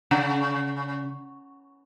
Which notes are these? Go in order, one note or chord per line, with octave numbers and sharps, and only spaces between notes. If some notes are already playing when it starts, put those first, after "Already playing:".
C#3